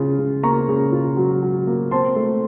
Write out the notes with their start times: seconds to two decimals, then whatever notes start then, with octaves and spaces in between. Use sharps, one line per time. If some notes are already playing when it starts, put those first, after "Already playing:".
Already playing: C#3 F4
0.19 C#3
0.43 A#3 A#5 C#6
0.69 C#3
0.92 F4
1.17 F#3
1.43 F#3
1.67 A#3
1.91 C4 A5 C6
2.16 A3